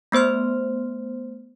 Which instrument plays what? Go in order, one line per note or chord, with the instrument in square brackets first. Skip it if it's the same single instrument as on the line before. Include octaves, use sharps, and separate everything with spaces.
[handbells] A3 B3 C5 C6 F6